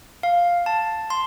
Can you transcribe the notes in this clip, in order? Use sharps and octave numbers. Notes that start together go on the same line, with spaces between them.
F5
A5
C6